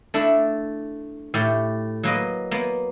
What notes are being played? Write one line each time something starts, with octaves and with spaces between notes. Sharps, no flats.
A3 D4 E4
A2 A3 G4
F#3 A#3 B4 D#5
A#3 B3